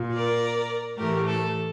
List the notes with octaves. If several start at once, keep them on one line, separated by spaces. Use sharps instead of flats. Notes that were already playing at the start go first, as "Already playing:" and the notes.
Already playing: A#2
A#4 D5
A2 E3 A3 G4 A#4
A4